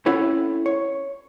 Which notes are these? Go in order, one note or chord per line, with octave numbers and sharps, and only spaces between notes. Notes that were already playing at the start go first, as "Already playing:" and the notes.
C4 C#4 E4 A4 C#5 F#5
C#5